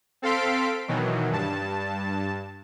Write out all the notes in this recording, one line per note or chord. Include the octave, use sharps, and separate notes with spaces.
C4 A4 F5 C6 B6 D7
B2 D#3 E3 F#3
G2 A5